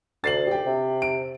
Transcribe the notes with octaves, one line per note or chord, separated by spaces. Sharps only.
D2 A6 C7 F#7
G4 G5
C3
D7